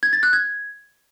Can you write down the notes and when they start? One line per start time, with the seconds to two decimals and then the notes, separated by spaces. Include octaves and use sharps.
0.03 G#6
0.13 A6
0.23 F#6
0.33 G#6